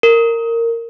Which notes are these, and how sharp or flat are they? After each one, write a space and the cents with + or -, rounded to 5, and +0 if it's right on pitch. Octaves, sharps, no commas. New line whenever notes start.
A#4 -15